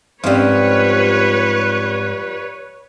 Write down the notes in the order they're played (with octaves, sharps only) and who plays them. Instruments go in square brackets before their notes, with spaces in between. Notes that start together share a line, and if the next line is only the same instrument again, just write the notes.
[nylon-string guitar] G#2 C4 C#4 [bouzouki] F3 G3 [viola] B4 C#5